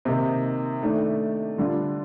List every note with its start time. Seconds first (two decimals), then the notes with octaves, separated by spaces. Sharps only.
0.05 C3 D#3 A#3 D#4 G4
0.82 D#3 A3 D4
1.58 D3 G3 D4 F4